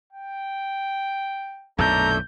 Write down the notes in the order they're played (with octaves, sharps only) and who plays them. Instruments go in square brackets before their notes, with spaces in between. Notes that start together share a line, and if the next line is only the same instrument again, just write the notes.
[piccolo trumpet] G5
[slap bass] B1 F#2 A#2 [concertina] A3 D4 A4 [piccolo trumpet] A#5 [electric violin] G6